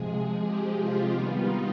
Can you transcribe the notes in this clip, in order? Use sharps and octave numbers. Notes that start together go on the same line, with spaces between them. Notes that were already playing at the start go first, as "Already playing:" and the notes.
Already playing: C3 F3 G#3 G#4
G4
F4
D#3 G3 B3
D#4